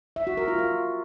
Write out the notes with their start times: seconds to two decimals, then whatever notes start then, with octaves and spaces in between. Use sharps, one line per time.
0.16 E5
0.27 F#4
0.37 A#4
0.48 F4
0.59 F4